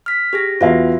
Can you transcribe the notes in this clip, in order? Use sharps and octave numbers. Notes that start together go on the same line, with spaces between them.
F6 B6
G4 G#4 A#6
E2 F4 F#4 E5 F5